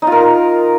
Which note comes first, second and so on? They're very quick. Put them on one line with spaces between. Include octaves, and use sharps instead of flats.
D#4 F4 A#4